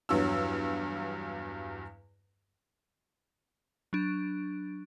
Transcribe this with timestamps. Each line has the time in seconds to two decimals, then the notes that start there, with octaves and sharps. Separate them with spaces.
0.09 E2 G2 F#3 E6
3.93 F#3 D4